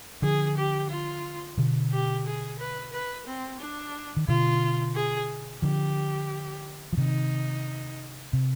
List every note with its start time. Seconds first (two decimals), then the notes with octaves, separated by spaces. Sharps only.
0.22 D3 F3 G#4
0.57 G4
0.90 F4
1.58 B2 D3
1.92 G4
2.26 G#4
2.59 B4
2.92 B4
3.26 C4
3.60 D4
4.17 D#3
4.28 B2 D3 F4
4.95 G#4
5.62 D3 F3 G4
6.93 F3
6.97 C3 D#3 D#4
8.33 C3